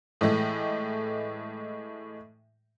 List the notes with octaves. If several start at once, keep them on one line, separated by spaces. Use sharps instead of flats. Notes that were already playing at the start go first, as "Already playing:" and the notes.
A2 E3 G#3 A3